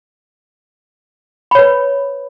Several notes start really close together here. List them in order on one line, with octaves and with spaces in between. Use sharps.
B5 C#5 B4